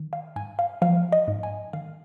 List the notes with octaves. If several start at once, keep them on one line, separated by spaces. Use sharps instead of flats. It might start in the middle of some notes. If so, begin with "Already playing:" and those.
Already playing: D#3
F5
G#2 G#5
F5
F3 F5
D#5
G#2
G#5
D#3 F5